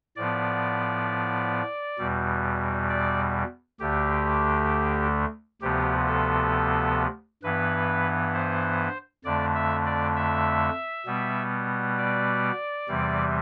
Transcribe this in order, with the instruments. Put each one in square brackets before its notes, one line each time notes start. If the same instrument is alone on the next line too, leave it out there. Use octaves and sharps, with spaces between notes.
[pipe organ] A2 F3 B3 D5
E2 B2 G3
D5
D2 D3 A3 G4
D2 C3 F3 B3 G4
A4
G2 E3 B3 B4
C5
F2 D3 A3 D5
E5
D5
E5
B2 G3 B3
D5
E2 C3 E3 G3